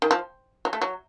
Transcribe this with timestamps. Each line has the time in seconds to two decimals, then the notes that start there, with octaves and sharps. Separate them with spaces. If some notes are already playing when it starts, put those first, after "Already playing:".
0.02 D#3
0.11 F3
0.65 F#3
0.73 A3
0.82 F#3